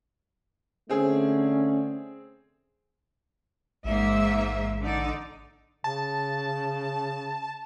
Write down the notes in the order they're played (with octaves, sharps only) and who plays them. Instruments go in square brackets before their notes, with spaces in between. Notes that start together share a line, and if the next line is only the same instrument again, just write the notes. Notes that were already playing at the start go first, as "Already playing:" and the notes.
[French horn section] D3 A3 [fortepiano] C4 G#4 [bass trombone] C#4
[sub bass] A1 [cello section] G#2 A#3 E5
[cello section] D3 D#4 D5
[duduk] C#3 [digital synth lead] A5